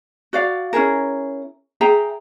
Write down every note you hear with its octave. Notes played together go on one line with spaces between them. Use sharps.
F#4 D5 F5
C#4 E4 G#4 A#4
G#4 E5 G5 A#5